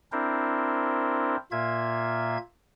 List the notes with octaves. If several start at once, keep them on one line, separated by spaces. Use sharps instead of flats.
C4 D4 E4 A#4 C5
A#2 A#3 F4 E5 G#6